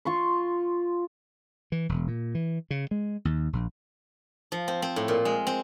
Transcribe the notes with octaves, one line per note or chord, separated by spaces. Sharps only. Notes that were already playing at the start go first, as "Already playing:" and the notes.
F4 C6 C#6
E3
E1
A#2
E3
C#3
G#3
D#2
A#1
F3
C4
C4
A2
A#2
G#3
C4